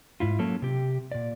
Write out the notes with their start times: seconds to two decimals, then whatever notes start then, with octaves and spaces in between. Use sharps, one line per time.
0.20 G#2 E4 F4
0.39 F#3 A#3 C#4 A4
0.62 C3 G4
1.12 A#2 D5